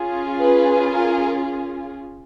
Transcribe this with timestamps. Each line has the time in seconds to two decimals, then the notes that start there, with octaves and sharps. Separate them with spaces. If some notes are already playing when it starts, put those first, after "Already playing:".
Already playing: C#4 F4 G#4
0.39 B4
0.90 A#4